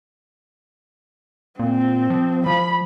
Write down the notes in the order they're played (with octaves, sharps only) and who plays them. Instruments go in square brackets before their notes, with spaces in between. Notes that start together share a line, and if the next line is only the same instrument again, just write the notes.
[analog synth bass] A#2 [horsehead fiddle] C4
[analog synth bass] F3
[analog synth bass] F3 [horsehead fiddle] B5